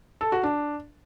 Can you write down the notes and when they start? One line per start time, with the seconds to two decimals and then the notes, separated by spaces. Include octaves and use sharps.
0.21 A4
0.32 F#4
0.43 D4